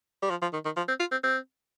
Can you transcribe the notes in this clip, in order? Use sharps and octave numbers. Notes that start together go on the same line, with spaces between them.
G3
F3
F3
D#3
D#3
F3
C4
F4
C4
C4